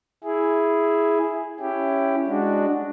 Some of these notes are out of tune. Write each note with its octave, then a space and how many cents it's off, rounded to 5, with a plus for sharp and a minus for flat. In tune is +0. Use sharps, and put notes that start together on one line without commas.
E4 +0 G#4 +0
C#4 +0 E4 +10 G4 +0
G#3 -10 D4 +0 F#4 +0